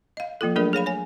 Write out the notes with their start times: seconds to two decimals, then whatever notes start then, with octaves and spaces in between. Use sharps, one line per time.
0.17 D#5 F5
0.41 F3 A#3 F4 A4
0.56 F#3 A3 D4 G#4 A#4 D5
0.73 G#4 C#5 F5 B5
0.86 C#5 G#5